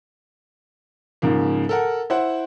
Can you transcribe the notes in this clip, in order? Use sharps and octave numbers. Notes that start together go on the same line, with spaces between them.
G#2 C#3 F3 A#3
A4 A#4 F#5
E4 C5 F#5